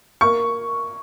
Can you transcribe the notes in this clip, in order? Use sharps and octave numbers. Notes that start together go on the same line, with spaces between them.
A#3 C#6